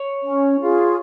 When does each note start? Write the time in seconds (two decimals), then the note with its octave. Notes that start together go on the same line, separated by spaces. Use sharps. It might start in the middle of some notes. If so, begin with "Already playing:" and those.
Already playing: C#5
0.23 C#4
0.60 F4 G#4